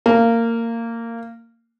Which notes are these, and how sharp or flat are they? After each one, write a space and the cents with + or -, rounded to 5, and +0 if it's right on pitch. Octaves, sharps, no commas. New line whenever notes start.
A#3 -20